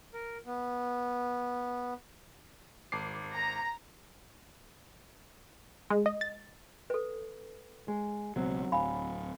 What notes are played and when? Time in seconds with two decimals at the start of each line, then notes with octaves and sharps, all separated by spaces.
0.14 A#4
0.46 B3
2.92 G#1 D6 C7
3.34 A#5
5.90 G#3
6.06 D#5
6.21 A6
6.90 A4 B4
7.88 G#3
8.36 C#2 B2 F#3 C4
8.72 D1 F5 G#5 B5